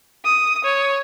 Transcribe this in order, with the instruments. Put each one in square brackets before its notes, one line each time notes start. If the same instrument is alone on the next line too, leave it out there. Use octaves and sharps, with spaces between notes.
[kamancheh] D#6
C#5